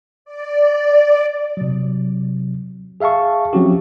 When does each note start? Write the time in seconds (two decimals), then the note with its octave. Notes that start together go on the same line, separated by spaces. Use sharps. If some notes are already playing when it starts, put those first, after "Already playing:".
0.25 D5
1.57 C3 F#3
3.00 G#4 E5 F5 A5 C#6
3.53 F3 F#3 C4 C#4 F#4 G4